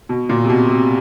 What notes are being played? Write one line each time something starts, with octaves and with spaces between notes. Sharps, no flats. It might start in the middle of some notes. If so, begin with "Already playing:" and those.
B2
A#2
C3
B2
C3